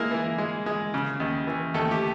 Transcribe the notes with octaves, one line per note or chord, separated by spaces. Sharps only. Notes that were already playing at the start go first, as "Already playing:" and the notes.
Already playing: G#3 A#3 E4 A#4
E3
G#3
G#3
C#3
D#2
E3
D#2 A3 A4
G4